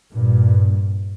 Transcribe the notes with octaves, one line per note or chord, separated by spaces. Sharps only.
G2 A#2